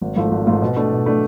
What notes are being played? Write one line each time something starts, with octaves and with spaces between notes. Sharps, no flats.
G#1
G#2 F3 A3 F4
G#1
G#2 F3 A3 F4
B2
A3 D4
B2
A3 D4